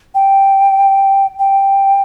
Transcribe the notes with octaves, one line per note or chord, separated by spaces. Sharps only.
G5
G5